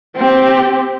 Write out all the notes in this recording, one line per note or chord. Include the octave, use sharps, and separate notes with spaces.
C4 G4